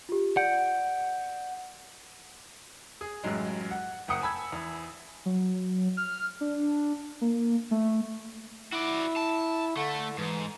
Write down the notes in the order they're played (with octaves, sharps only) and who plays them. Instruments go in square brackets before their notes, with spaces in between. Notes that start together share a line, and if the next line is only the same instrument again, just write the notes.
[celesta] F4 G4
[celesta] D5 G6 D7 [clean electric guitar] F#5
[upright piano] G#4
A1 F#2 F#3 G#3
F#5
F#1 F#5 G5 D#6 C#7
G#5 A5 B5 E6 G#6
E2
[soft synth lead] F#3
F6
D4
A#3
A3
[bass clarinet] E4 [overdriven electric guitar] F#4 D5
[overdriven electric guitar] A5
[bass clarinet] D3 [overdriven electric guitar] A3
[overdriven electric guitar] G#2 [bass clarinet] E3